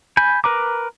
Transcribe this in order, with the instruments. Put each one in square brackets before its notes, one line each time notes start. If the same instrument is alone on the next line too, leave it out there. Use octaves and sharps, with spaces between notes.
[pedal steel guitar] G#5 B5 G6
A#4 B4 A#5 D6